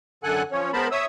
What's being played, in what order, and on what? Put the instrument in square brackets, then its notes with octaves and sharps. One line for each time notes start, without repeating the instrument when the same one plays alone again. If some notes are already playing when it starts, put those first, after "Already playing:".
[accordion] F#2 D3 A4 F#5 G#5 F#6
F3 C#4 C#5
G#3 B3 A#4 C5 A5 B5
C#5 E5 D#6 E6